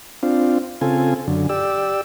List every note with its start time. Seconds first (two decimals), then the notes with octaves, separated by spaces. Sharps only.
0.23 C4 D4 F4
0.81 C#3 C4 F4 A4 G#5
1.28 F#2 D3
1.49 G4 D5 E6